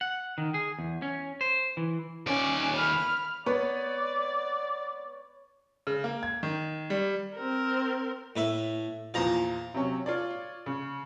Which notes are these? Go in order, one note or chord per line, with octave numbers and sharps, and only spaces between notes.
F#5
D#3
G#4
E2
C#4
C5
E3
D#2 C#4 D5
B5 F6
B3 B4 C#5 D5
C#3
A#3
G#6
D#3
G3
C4 A#4
A2 B4 E5
E2 A#2 F3 F5 A#5 C6
C3 F#3 C#4
F4 C#5 D5
C#3